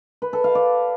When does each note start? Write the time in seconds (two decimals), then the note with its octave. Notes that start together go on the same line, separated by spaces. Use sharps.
0.22 B4
0.33 A4
0.44 F5
0.55 D5